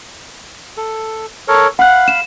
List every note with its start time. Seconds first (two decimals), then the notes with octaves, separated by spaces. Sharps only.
0.77 A4
1.48 A4 A#4 C#5
1.79 F5 F#5 B5 F#6
2.08 E7